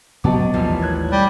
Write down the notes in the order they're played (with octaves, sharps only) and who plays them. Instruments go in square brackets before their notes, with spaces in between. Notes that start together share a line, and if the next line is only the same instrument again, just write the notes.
[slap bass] B2 B3 C4 [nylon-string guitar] F#3 [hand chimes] D#5 A5 D6
[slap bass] A1 D#2 B2 [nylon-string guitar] E3 F3 G3
[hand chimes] C#5 F#6 G#6
[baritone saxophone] G3